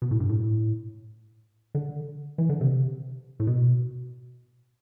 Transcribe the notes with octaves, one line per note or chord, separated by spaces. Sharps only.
B2
A2
G2
A2
D3
E3
D3
C3
A2
B2